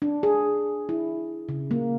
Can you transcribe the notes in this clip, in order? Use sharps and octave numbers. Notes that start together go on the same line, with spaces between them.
D4
G#4
E4
C#3
A#3